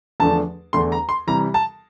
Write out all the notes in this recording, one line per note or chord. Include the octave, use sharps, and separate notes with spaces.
E2 D3 F3 A3 D4 A5
E2 D3 A3 D4 C6
A#5
C6
C3 E3 G3 A#5
A5